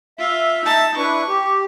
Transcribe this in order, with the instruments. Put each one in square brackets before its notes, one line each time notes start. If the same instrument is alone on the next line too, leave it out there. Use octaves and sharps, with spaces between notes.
[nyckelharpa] F4 [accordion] E5
[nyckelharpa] D#4 A5
[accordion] D4 E4 B4 [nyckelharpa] C#6
[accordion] G4